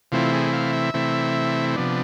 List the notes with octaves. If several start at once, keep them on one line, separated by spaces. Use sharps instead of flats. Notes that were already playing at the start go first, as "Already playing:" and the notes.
C3 E3 A3 C4 E4 F4
G#4
F5
E5
C3 E3 A3 C4 E4
C3 F3 B3 D4